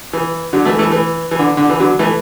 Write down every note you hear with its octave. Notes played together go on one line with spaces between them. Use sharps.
E3
D3 F#3
E3 A3
E3 A3
E3
E3
D3
D3
E3
D3 F#3
E3 A3